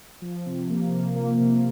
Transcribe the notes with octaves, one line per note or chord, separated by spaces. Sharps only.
F3
C3
A#3
A#3
A#3
C3